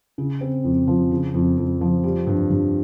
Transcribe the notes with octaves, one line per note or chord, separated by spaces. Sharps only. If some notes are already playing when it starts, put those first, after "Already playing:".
C#3
C4
F2
F3
C#3
F2
F2
F3
G3
G2
G2